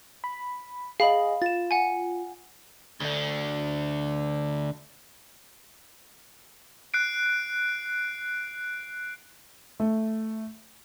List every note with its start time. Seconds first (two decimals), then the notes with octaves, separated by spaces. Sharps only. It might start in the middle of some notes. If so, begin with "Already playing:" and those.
0.24 B5
1.00 G#4 D#5 F5 B5 F#7
1.42 F4 A6 E7
1.71 F#5 G#5
3.00 D2 D3
6.94 F#6 C7 D7
9.80 A3